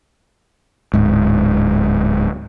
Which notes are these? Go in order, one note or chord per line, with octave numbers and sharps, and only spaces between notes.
D1 G#2